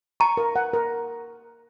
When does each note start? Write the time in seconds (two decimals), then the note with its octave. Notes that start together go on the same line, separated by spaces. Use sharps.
0.20 A#5 C#6
0.37 A#4
0.56 F#5
0.73 A#4